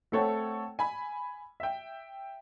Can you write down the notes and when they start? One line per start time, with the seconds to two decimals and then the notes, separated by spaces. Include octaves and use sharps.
0.12 A3 C4 A4 C#5 F#5 G5
0.79 G#5 B5
1.60 E5 G5